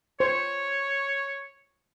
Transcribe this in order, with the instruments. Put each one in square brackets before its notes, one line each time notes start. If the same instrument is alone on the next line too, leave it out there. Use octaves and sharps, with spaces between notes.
[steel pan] C5 [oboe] C#5